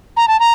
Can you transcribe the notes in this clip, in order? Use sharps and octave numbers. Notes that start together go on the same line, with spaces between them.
A#5
A5
A#5